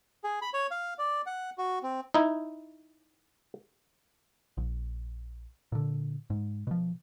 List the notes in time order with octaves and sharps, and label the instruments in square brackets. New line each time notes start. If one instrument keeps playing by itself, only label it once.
[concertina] G#4
B5
C#5
F5
D5
F#5
F#4
C4
[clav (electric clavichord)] D#4 E4
[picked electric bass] A#1
A#2 D3
G#2
B2 F3